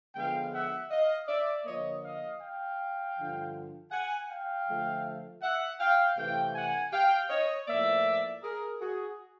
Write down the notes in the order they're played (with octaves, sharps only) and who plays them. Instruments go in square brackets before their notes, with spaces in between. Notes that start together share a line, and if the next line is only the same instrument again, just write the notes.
[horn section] D3 F3 G#3 B3 F5 G5
E5 F#5
D#5 F5
D5 E5
D3 F3 A#3 C#5 D#5
D#5 F5
F5 G5
G2 D3 F3
F#5 G#5
F5 G5
D3 F3 A3
E5 F#5
F5 G5
C3 E3 A3 F5 G5
F#5 G#5
F5 G5
C#5 D#5
A2 F3 A#3 D5 E5
G#4 A#4
F#4 G#4